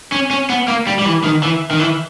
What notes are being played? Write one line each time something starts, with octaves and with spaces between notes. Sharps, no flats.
C#4
C#4
B3
A#3
G3
G3
E3
D#3
E3
D#3
E3